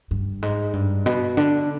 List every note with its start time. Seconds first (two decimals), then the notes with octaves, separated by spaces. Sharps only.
0.11 G2
0.42 G#2
0.73 G2
1.06 B2
1.37 D3